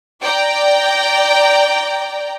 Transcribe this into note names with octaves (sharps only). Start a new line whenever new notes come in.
D5 G5 A#5